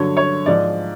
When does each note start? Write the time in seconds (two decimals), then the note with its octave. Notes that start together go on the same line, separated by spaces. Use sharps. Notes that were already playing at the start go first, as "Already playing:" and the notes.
Already playing: G2 D3 F#3 C#5
0.17 C#5
0.46 G#2 F3 D5